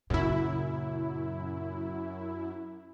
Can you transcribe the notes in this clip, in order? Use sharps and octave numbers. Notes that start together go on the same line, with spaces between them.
F#2 A#2 C#3 E4